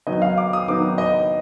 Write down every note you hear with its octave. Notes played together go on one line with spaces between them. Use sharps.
D#3 F#3 B3 D#4 D#5
F5
D6
D#6
D#3 F#3 B3 D#4 D6
D#5